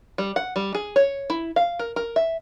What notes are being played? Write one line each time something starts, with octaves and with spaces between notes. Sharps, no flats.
G3
F#5
G3
G#4
C#5
E4
F5
A#4
A#4
E5